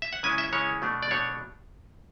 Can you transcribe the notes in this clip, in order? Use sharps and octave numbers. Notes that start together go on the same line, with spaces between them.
E5
F#5
C#3 G#3 C#4 E4 G#5
E5
C#3 G#3 C#4 E4 C#5
B2 A3 D4
D5
B2 A3 D4 C#5